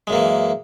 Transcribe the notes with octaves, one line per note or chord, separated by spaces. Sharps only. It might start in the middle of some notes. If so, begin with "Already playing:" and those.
F#2 E3 G#3 A#3